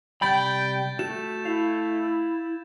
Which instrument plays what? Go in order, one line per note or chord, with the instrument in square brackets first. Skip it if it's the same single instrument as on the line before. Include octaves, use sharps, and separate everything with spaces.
[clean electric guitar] C3 G3 B5 [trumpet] G5 [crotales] G6 A6 B6
[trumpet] A3 [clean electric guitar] F#4 [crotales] E7
[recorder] E4 [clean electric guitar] F5